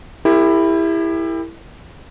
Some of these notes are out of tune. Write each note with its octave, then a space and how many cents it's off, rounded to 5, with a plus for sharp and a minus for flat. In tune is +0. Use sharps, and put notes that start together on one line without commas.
E4 +0 G4 +35 A#4 -25